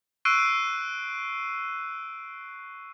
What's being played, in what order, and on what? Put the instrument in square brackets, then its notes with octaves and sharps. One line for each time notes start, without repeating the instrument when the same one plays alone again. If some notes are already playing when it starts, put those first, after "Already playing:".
[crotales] C#6 E6 F#6 C7 D7 D#7